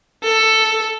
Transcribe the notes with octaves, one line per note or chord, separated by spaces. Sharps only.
A4